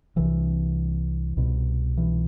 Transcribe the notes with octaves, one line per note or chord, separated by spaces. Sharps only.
C2 C3 E3
C2 B2
E3